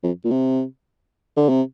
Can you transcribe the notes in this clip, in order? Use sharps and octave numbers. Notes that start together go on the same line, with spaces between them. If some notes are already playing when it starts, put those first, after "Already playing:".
F2
A#2
C3
D3
C3